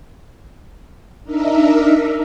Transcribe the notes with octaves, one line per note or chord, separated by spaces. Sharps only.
D4 D#4 A#4 E5